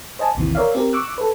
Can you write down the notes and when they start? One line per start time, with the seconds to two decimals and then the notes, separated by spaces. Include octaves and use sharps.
0.19 C5 D#5 G#5 A5
0.35 A1 D#2 C3 E3
0.55 A#4 C#5 D5 E5 F5
0.75 C4 G4 A#4
0.93 C#6 D6 E6 F#6
1.18 A4 B4